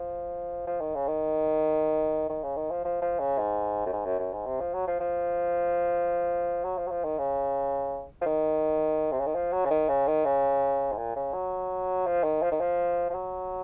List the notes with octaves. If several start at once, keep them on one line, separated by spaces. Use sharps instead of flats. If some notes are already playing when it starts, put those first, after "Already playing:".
Already playing: F3
F3
D#3
C#3
D#3
D#3
C#3
D#3
F3
F3
F3
C#3
G#2
F#2
G#2
F#2
F#2
G#2
C3
F3
F#3
F3
F3
F#3
F3
F#3
F3
D#3
C#3
F3
D#3
C3
C#3
D#3
F3
F#3
C#3
D#3
C#3
D#3
C#3
G#2
A#2
C#3
F#3
F3
D#3
F3
D#3
F3
F3
F#3